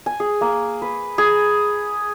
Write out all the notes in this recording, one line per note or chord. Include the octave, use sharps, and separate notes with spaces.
G#5
G#4
A#3
B4
G#4